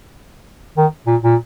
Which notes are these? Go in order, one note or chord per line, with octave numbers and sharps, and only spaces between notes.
D#3
A#2
A#2